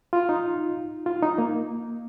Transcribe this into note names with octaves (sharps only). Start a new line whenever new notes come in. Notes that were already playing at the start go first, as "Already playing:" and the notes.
F4
D#4
F4
D#4
A#3